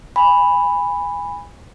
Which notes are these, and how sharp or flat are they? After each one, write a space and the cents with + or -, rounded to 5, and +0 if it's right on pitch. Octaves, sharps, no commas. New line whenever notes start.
G#5 -25 B5 +0